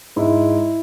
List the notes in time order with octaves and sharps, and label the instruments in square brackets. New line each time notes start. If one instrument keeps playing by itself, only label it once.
[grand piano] G#2 E4